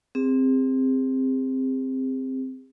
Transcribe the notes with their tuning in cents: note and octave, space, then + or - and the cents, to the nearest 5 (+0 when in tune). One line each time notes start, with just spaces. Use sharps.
C4 +0 G#4 -40